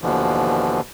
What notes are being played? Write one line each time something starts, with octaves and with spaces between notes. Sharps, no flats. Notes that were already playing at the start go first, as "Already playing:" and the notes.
D#2 B2 D3 E3 F3